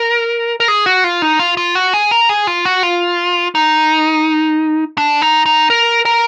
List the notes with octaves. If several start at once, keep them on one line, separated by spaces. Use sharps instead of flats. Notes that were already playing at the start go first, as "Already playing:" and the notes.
Already playing: A#4
A#4
G#4
F#4
F4
D#4
F4
F4
F#4
G#4
A#4
G#4
F4
F#4
F4
D#4
D4
D#4
D#4
A#4
A#4